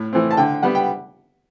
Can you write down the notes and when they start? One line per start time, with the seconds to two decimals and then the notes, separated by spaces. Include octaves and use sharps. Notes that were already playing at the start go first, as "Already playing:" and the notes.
Already playing: A2
0.13 E3 A3 C4
0.31 A5
0.37 D3 G5
0.63 G3 B3 F#5
0.75 G5